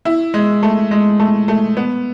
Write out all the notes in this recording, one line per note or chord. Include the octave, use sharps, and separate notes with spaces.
E4
G#3
A3
G#3
A3
A3
B3